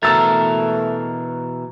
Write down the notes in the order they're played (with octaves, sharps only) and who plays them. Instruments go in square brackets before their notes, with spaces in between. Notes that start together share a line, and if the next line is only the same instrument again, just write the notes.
[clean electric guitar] B2 E3 A#4 [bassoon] A3 [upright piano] E6 A6